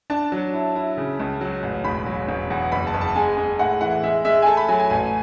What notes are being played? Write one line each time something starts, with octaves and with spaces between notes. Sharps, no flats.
D4 A5
F#3
E4
E4
C#3
C#2
F#3
A1
E1 B5
F#3
E1
E2
F#1 B5
A5
F#1
A5
G#3 G#5
G#3
A2 F#5
E3 F#5
G#3 E5
G#3 E5
G#5
A3 A5
B5
F#3 G#5
G#5
A1 G#5